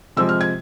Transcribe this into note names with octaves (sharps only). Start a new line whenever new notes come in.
C3 F3 G#3 E6
F6
G#6